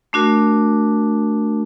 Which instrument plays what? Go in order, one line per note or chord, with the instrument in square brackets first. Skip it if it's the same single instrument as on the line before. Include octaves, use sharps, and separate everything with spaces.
[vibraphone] A3 D4 F#4 A#4